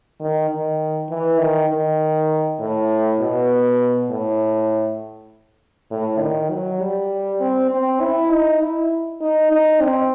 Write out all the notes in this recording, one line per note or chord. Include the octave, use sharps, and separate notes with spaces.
D#3
D#3
E3
D#3
D#3
A2
B2
A2
A2
D#3
F#3
G3
C4
C4
E4
D#4
E4
D#4
D#4
C4